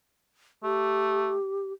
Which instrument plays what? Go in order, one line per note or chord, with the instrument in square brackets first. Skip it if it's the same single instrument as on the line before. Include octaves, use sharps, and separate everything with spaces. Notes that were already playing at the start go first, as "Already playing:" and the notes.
[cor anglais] A3 [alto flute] G4